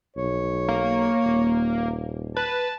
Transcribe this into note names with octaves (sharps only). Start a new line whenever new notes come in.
B1 C#5
A#3
D#1
B4 A5